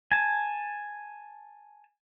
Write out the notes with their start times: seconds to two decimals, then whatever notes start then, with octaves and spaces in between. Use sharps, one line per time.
0.12 G#5 A5